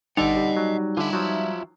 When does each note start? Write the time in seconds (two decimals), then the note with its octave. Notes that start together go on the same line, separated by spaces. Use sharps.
0.17 G1 D3 G3 D#4 D5 D#5 F#5 G5
0.36 G3
0.57 F#3
0.97 D3 F4 E5 G#5
1.13 F3 F#3